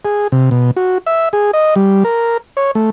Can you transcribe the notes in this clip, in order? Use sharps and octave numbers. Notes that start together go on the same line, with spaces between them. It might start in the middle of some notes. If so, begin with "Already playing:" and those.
G#4
C3
B2
F#4
E5
G#4
D#5
G3
A#4
C#5
A3